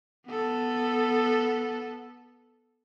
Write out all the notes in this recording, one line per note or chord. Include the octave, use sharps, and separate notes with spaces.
B3 A4